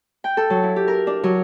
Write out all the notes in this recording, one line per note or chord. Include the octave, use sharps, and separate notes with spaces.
G5
A4
F#3
E4
G4
A#4
D4
F#3